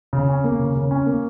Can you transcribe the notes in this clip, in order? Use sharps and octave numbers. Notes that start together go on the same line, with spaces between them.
C#3
C#4
A#3
C#3
C#3
C#4
A#3